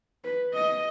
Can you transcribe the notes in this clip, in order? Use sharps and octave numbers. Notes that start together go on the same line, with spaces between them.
B4
D#5